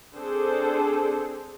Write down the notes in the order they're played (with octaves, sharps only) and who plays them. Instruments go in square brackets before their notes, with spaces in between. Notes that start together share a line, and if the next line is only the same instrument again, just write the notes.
[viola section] C4 D4 G#4 A4 C5